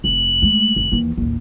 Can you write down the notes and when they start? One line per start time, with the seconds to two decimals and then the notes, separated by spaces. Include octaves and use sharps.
0.04 F1 F#7
0.42 G#3 A3
0.76 F1
0.92 D#2 E3
1.18 A1 D#2